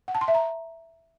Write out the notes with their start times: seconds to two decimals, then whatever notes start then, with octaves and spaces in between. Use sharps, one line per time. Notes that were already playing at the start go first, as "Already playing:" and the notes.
0.08 F#5
0.15 A5
0.21 C6
0.28 E5
0.35 A#5